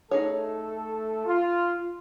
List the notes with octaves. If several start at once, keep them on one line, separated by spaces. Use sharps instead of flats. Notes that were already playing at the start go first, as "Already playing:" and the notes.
A3 D#4 G#4 A4 C#5
F4